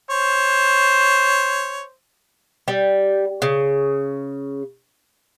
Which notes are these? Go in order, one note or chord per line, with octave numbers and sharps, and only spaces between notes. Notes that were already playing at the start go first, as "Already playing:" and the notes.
C5 C#5
G3
C#3